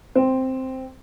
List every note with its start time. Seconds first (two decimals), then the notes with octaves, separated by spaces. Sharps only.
0.15 C4